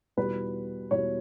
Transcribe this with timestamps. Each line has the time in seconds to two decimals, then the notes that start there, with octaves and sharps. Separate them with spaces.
0.17 E2 B2 G3 B3 B4
0.91 E2 B2 G3 B3 C#5